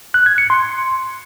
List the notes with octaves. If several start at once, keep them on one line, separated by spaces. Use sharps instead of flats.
F#6
G#6
C#7
C6